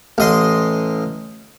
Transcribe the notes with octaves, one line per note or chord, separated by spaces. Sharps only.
A1 D#5 C6